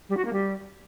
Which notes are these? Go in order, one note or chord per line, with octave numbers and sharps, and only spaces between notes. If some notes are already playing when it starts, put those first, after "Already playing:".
G3
F#4
A#3
G3